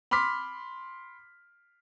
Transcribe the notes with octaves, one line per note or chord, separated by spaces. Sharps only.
B5 C6 D6 F6 B6